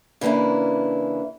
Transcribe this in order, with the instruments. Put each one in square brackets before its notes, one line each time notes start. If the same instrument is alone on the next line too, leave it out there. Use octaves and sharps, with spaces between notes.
[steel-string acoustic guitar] C#3 E3 A#3 D4 E4